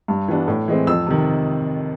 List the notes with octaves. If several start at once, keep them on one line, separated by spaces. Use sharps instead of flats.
G2
E3 G3 B3 D4
A2
E3 G#3 C4
F2 E6
C3 D#3